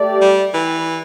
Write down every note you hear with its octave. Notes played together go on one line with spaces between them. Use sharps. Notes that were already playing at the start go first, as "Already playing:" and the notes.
Already playing: A3 G4 D5
G3
E3